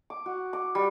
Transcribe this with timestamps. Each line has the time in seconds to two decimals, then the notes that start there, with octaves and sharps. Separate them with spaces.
0.10 D6
0.26 F#4
0.53 D6
0.75 G3